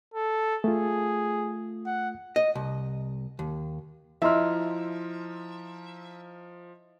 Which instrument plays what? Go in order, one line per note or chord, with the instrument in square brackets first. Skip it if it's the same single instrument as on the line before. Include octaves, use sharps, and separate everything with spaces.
[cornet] A4
[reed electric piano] A3 F4 [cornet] G#4
[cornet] F#5
[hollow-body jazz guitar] D#5
C2
D#2
[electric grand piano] F3 A#5 F6 [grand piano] E4 D#5 C6 [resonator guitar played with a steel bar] E5